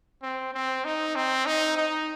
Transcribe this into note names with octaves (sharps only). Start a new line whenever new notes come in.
C4
C4
D#4
C4
D#4
D#4